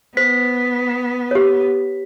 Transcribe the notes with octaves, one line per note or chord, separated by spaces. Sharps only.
B3 C5 B6
G4 C#5